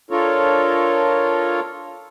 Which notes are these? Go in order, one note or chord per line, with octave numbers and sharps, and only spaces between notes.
D4 F4 A4 A#4 C#5